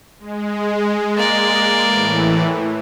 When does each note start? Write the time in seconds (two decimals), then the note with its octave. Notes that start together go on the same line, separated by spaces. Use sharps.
0.19 G#3
1.17 A#3 D5
1.81 A2 E3